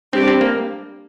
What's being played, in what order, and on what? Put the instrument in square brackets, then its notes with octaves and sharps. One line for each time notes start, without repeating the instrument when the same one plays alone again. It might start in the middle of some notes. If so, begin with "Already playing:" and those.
[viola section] G3 D4 G4 D5 [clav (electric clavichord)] C4
[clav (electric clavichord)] C4
A#3